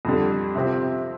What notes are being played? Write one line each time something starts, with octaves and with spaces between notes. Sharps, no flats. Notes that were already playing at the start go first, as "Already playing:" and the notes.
F2 D3 G3
C3 F3 C4 G4